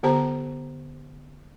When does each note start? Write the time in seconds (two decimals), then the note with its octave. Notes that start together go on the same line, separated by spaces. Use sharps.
0.03 D3 B3 G4 C5 A5 A#5